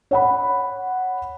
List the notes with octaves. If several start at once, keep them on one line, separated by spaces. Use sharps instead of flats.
C#5 F#5 B5